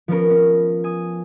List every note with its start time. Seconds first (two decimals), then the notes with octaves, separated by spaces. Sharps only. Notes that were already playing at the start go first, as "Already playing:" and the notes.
0.08 F3 B3 C#4 A#4
0.30 C#4
0.84 G#5 D#6